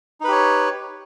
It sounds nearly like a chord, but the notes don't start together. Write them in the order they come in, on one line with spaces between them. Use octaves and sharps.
D#4 B4 G4 C#5